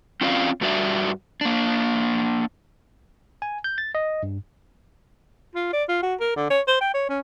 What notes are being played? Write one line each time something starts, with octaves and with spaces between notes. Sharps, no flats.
C4 C#4 F4 D5 E5 F5
G2 G3 F#4 D5 E5
A#3 D4
G#5
G6
A6
D#5
G2
F4
D5
F4
F#4
A#4
D3
C#5
C5
G5
C#5
C#4